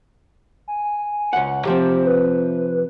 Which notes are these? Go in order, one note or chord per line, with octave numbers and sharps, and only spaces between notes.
G#5
C#2 F#5
C3 F3 C4 G4
B4